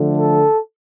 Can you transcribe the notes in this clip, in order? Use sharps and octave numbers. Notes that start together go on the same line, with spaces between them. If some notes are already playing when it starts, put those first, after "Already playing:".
Already playing: D3 F3 A3
A4